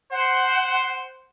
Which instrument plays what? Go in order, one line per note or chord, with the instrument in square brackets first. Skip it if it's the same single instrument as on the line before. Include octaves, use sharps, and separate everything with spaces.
[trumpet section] C5 [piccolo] F#5